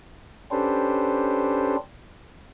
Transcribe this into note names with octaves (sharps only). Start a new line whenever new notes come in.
C#4 D4 G4 A4 B4 C5